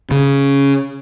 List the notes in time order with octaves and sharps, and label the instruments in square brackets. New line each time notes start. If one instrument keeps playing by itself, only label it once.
[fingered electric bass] C#3